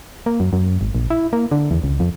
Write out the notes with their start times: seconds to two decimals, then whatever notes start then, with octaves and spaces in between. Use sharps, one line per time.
0.26 A#3
0.40 F#2
0.53 F#2
0.81 G#1
0.95 A#1
1.10 E4
1.33 A#3
1.51 D3
1.71 E2
1.84 C#2
2.00 F2